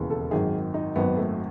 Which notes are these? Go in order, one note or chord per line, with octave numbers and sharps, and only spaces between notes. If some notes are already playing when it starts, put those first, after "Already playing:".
Already playing: E1 D#2 C#3 E3
A4
G#1 F#2 D#3 G#4
D#4
G#1 F#2 D#3 B3
A3